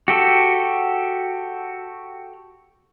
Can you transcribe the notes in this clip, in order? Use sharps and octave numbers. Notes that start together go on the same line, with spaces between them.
F#4 G4 A4